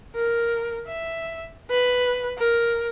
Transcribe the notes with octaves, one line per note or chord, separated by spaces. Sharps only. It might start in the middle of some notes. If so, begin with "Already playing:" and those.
A#4
E5
B4
A#4